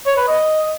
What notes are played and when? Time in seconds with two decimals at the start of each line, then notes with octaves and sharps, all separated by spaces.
0.06 C#5
0.16 B4
0.27 D#5